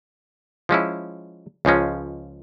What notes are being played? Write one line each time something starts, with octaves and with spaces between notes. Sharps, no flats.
F3 G#3 C#4 E4
C#2 C#3 F3 G#3 C#4